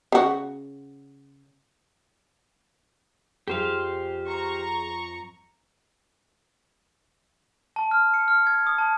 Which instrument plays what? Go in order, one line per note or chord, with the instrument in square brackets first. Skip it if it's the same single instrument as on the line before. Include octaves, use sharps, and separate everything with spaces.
[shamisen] C#3 F#4
[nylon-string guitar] F2 F3 [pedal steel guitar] G4 C5 F5 [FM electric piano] G#4
[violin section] A#5 C#6
[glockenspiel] A5
F6
C#7
F6
G#6
D#6
A5